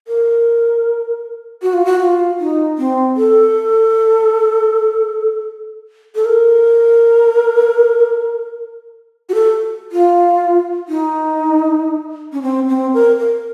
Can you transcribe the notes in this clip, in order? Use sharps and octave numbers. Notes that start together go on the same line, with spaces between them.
A#4
F#4
F4
F#4
F4
D#4
C4
A4
A4
A#4
F#4
A4
F4
D#4
C#4
C4
C4
A#4
A#4